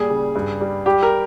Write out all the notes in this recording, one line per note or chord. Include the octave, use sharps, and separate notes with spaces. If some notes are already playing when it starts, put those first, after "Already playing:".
Already playing: A#2 G3 G#4
C#3
G2
G3
G3 G4
A#4